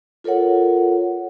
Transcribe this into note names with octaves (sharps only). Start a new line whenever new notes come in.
F4 A4 A#4 C#5 F#5